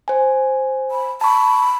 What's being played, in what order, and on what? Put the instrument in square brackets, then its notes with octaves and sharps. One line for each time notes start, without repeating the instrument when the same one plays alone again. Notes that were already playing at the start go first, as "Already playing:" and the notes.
[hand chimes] C5 G#5
[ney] B5
[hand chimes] A5 C#6 [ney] B5